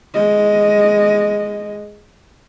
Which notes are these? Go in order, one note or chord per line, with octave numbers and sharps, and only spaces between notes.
G#3 D#5